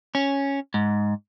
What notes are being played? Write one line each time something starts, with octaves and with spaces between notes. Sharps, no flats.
C#4
G#2